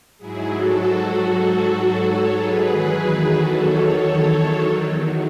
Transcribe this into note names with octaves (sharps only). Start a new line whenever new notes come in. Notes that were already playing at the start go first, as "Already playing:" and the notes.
G#2 F#3 E4 G#4
F#4 A4
A4 C#5
G#4 B4
E2 D#3 F#3
F#4 A4
A4 C#5
A4 C#5